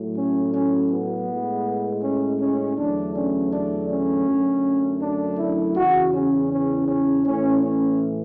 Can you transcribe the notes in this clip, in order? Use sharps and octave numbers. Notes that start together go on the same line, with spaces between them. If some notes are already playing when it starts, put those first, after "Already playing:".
Already playing: A2 F#3 A3
C#4
C#4
B3
A2 G#3
C#4
C#4
E2 D3 F#3 A3 D4
C#4
D4
C#4
F#2 D3 F#3 A3
D4
E4
E2 C#3 E3 F#4
C#4
C#4
C#4
A2 E3 A3 C#4
C#4